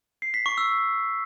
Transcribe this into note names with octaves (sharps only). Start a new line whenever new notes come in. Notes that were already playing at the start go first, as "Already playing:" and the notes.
C7
B6
C#6
E6